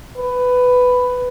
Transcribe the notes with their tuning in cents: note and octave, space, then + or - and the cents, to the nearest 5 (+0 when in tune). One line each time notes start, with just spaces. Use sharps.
B4 +10